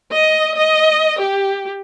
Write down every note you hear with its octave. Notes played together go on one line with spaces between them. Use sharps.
D#5
D#5
G4